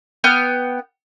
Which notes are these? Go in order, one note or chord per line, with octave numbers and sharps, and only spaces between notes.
B3 G5 F6